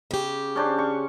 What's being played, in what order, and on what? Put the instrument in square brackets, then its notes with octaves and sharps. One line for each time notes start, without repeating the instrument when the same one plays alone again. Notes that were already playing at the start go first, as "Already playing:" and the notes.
[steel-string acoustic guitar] C#3 G4
[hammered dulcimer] C#4 D4 C5
C#6